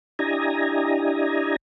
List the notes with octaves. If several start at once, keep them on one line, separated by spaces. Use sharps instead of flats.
D4 E4 G4 D#5 G#5 A#5